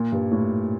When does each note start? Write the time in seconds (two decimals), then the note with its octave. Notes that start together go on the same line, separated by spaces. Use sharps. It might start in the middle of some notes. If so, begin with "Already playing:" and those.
Already playing: A#2
0.12 G2
0.32 A2